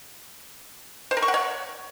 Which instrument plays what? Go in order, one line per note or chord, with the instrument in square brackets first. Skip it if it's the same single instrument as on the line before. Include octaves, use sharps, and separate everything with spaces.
[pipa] C5
A#4
C#6
F#5
C#5